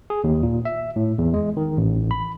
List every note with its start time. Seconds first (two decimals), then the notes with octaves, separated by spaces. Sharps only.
0.10 G#4
0.24 D#2
0.43 A#2
0.65 E5
0.96 A2
1.18 E2
1.34 G#3
1.57 D#3
1.77 A1
2.11 B5